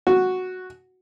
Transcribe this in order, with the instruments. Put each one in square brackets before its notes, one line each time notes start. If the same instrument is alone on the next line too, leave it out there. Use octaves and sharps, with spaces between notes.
[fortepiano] F#4